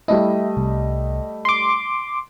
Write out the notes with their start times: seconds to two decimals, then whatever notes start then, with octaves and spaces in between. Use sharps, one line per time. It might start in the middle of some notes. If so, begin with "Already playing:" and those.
0.08 G3 A3 E4 D#5
0.57 C2
1.45 C6 D6